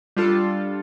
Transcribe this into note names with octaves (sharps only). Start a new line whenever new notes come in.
G3 D4 F4 A4